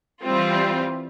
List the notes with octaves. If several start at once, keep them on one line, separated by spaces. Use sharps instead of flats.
E3 G3 C4 F4